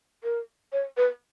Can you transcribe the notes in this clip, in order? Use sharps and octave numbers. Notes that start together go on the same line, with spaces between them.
A#4
C#5
B4